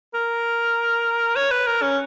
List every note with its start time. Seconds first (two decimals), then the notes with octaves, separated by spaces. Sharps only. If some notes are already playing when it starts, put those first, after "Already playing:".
0.14 A#4
1.36 C#5
1.51 B4
1.67 A#4
1.82 C#4